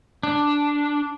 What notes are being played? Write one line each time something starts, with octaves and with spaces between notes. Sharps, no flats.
D4